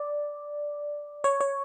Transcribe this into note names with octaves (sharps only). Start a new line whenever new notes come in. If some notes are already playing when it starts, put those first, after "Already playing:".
Already playing: D5
C#5
C#5